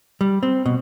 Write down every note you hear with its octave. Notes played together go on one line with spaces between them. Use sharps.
G3
C4
B2